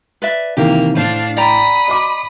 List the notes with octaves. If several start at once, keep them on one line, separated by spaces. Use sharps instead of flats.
B4 D5 E5
C3 D#3 E3 A#3 G4
A2 D4 C5 F5
D5 G5 A#5 B5 D#6
D#5 C6 D6